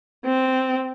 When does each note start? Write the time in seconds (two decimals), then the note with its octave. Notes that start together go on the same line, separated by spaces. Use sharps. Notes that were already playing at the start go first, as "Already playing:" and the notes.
0.25 C4